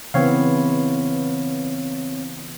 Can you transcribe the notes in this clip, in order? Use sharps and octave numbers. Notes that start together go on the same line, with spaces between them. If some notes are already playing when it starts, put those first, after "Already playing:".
C#3 E3 B3 C4 C#5 F5